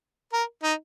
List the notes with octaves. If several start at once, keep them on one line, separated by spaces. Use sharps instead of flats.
A#4
D#4